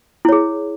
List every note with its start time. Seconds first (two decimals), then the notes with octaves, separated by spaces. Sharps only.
0.25 E4
0.29 C#5
0.32 G#4